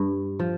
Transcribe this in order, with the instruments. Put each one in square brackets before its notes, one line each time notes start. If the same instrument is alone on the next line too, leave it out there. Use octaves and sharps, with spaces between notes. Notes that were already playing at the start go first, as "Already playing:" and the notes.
Already playing: [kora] G2
F3